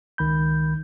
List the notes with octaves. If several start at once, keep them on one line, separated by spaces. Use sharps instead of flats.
C#2 D#3 B5 G6